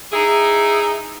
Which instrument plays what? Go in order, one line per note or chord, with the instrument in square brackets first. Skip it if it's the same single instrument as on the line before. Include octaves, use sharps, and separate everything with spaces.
[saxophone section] D#4 E4 G#4